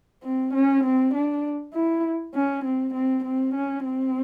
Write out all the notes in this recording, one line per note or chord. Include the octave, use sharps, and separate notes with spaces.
C4
C#4
C4
D4
E4
C#4
C4
C4
C4
C#4
C4